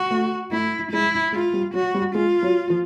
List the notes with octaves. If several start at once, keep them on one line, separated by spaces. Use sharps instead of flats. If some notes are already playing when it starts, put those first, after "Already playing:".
Already playing: F#4
A3
A3 E4
G#3 E4
G#3 F4
G3
F#3 F#4
G3
G#3 F4
F#3
F3